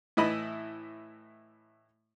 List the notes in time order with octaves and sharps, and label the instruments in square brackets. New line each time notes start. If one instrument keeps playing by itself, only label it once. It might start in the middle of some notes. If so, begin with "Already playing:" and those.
[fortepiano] A2 E3 E4 D#5 A5 B5